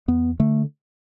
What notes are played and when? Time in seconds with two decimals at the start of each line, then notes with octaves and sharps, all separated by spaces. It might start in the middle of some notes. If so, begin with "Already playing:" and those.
0.08 E2 B3
0.40 D3 A3